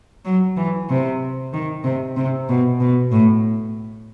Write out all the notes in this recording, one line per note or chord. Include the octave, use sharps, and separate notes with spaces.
F#3
E3
C3
D#3
C3
C3
B2
B2
A2